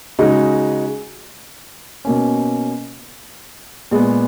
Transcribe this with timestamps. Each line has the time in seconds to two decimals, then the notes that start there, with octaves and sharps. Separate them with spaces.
0.19 C#3 G#3 D#4 F#4
2.05 B2 A#3 C#4
3.91 A#2 G#3 B3